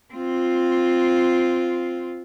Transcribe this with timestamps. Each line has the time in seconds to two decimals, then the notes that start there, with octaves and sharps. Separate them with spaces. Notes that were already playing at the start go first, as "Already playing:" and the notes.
0.14 C4 F4